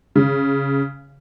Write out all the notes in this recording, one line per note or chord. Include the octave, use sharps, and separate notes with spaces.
C#3